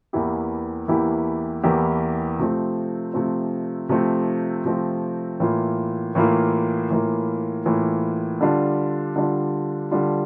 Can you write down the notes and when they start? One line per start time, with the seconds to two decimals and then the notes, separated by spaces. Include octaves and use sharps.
0.13 E2 E3 A#3 E4 G4
0.88 E2 E3 A#3 E4 G4
1.63 E2 E3 A#3 E4 G4
2.39 C3 F3 A3 C4
3.14 C3 F3 A3 C4
3.89 C3 F3 A3 C4
4.64 C3 F3 A3 C4
5.40 A2 E3 A#3 F4
6.15 A2 E3 A#3 F4
6.90 A2 E3 A#3 F4
7.65 A2 E3 A#3 F4
8.41 D3 G3 D4 F4
9.16 D3 G3 D4 F4
9.91 D3 G3 D4 F4